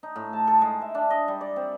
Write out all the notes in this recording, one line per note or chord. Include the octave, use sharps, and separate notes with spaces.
D#4
A2
A5
A4
G#3
E5
D4
D#5
G3
D5
C4